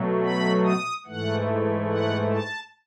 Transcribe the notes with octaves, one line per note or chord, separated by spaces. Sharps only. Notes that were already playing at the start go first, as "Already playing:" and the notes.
Already playing: B2 F#3 A3
B5
D#6
G#2 E3 A3 F#5
F#5
A5